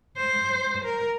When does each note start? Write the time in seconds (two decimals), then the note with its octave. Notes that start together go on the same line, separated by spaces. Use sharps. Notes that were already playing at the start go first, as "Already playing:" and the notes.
0.17 C5
0.85 A#4